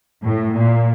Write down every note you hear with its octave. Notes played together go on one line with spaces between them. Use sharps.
A2
A#2